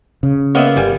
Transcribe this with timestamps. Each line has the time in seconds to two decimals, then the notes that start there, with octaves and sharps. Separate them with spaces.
0.23 C#3
0.55 A#3 B3 C#5 D#5 E5
0.76 G1 G3 G#5